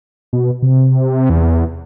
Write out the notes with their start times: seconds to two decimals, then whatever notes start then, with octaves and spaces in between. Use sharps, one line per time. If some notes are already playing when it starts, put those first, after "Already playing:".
0.33 B2
0.62 C3
1.30 E2